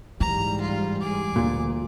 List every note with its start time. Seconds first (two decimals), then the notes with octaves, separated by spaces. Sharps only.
0.20 G#2 E3 G3 A#5
0.61 F4
1.01 G#4 D6
1.36 D2 A#2